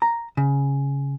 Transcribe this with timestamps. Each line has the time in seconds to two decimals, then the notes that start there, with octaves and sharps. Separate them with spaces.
0.02 A#5
0.37 C#3